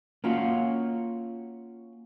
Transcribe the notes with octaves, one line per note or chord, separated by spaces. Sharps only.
A#3 C#4 F4 F#4